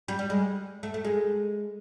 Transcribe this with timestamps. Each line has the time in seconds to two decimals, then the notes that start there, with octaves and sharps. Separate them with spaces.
0.08 G3
0.19 G3
0.30 G#3
0.83 A3
0.94 A3
1.05 G#3